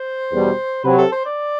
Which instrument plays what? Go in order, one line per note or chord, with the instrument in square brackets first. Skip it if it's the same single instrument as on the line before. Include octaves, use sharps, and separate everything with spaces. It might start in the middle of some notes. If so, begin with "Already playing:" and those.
Already playing: [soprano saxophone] C5
[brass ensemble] E2 B2 G3 D4
[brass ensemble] C3 F#3 C4 [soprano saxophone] B4
[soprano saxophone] A4
C5
D5